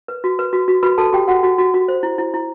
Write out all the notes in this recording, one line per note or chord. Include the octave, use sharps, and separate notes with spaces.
B4
F#4
B4
F#4
F#4
F#4 B4 B5
F#4 A4 A5
F#4 G4 G5
F#4 F#5
F#4
F#4
F#4
C5
E4
E4
E4